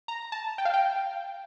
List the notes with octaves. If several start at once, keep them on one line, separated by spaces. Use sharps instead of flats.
A#5
A5
G5
F5
G5